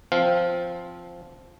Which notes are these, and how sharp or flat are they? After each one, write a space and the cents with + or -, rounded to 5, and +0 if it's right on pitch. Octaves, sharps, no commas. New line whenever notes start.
F3 +0 C4 +0 F5 +5